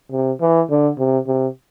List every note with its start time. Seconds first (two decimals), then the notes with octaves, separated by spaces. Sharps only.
0.12 C3
0.41 E3
0.70 D3
0.98 C3
1.27 C3